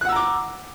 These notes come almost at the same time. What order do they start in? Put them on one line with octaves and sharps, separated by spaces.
F#6 F#5 E6 A#5 D6